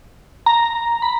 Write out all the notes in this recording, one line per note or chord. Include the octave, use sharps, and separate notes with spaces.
A#5
B5